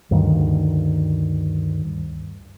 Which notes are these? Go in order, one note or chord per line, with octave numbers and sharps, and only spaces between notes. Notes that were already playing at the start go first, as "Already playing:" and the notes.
D2 G2 D#3